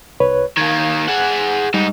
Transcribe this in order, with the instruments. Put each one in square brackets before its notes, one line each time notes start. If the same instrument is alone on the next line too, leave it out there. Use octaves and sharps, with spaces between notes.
[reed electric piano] C2 B4 C#5
[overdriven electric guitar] D#3 A#3 [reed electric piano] G#6
[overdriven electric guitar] G#4 F#5
[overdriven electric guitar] G#2 D#4 [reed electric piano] G3